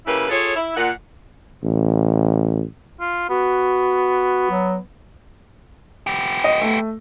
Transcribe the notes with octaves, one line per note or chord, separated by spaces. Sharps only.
C#3 A#3 E4 G4 B4
F4 G#4 A4 C#5
E4
A#2 F#5
A1
F4
B3 F#4
F#3
B3 G4
D#5
A3